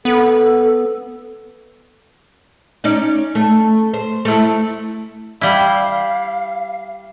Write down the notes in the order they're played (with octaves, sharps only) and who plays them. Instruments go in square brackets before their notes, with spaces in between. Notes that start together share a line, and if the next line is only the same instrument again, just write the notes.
[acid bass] B3 [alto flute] A4
[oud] C#4 D#4 D5
A3
C5
A3 E4
[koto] G3 E4 [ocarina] F5